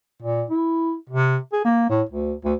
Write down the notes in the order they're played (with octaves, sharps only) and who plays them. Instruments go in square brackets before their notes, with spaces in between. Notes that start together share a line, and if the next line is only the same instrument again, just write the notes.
[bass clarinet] A#2
E4
C3
G#4
A#3
A2
D2
D2